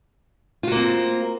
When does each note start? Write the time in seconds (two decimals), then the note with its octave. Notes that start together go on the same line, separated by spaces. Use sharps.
0.63 F4
0.68 F#4
0.72 A#3
0.76 C4